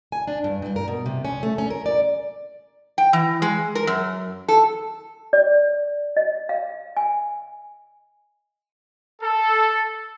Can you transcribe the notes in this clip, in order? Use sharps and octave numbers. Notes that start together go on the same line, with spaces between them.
G#5
D4
G2
G2
A#4
B2
C3
C#4
A3
C#4
A#4
D5
G5
E3
G#3
A#4
F#2
A4
D5
D#5
F5
G#5
A4